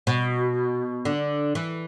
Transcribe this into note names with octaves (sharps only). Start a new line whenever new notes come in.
B2
D3
E3